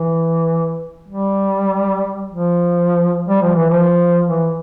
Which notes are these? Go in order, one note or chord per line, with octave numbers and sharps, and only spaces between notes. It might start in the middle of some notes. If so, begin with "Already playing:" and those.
Already playing: E3
G3
F3
G3
F3
E3
F3
E3